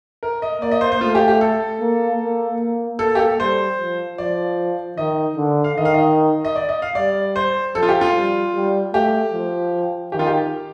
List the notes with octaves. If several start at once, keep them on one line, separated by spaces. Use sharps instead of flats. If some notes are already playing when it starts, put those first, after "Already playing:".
A#4
D#5
A#3 D5
D#5
C5
C5
A3 F4
G4
G4
A4
A#3
A#3
A#3
A#3 A4
G4
A4
G3 C5
F3
F3 D5
D#3 D#5
D3
F5
D#3 D#5
F5
D#5
D#5
D5
D#5
F5
G3 D5
C5
F3 A4
F4
G4
F4
G3
G3
A3 G4
F3
D#3 G4
F4
G4